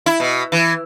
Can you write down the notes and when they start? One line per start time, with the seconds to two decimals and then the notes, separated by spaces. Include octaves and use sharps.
0.06 E4
0.20 B2
0.52 E3